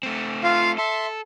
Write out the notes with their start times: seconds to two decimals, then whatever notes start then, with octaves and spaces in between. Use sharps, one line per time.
0.03 A3 C4
0.44 F4 F5
0.78 A4 E5 C6